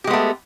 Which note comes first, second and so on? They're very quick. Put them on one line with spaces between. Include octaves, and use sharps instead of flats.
G4 G#3 B3 A3